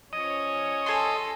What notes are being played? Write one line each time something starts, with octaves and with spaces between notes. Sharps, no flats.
F3 C#4 C#5 D#5
A4 G#5 C6